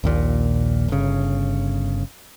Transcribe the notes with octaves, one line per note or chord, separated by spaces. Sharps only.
A#1 D#2 A#2
G1 C#3